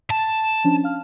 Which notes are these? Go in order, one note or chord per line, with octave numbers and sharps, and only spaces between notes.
A5
F3 C#4 D4
F5 F6